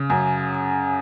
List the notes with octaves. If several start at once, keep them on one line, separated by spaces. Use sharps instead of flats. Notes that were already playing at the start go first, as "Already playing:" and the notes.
Already playing: C#3
F#2